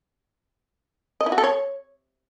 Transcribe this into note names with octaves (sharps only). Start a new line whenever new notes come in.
D#5
E4
F#4
A4
C#5